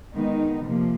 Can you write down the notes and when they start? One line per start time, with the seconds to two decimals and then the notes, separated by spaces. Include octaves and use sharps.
0.13 D#3 G#3 B3 D#4
0.63 C3 F3 A#3